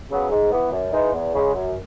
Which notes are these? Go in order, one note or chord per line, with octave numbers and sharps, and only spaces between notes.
C#3 F#3 B3
G#2
E3 B3
F#2
E3 G#3 D#4
E2
C#3 G#3
F#2